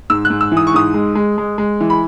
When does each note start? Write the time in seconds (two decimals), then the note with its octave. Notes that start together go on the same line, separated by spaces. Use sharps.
0.10 G#2 E6
0.25 F#6
0.30 G#2
0.41 E6
0.52 E3
0.57 D#6
0.67 C#6
0.74 G#2 D#6
0.94 G#3
1.15 G#3
1.38 G#3
1.58 G#3
1.80 E3
1.90 B5